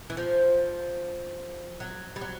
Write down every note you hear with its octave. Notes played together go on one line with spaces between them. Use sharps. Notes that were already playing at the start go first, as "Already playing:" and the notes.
E3
F3
F#3
G3
F#3